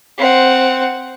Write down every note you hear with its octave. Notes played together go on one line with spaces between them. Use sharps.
C4 F#5